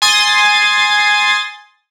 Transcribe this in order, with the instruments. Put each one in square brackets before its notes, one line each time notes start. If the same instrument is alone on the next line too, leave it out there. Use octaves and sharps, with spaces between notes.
[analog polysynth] G#5 C6 D#6 A6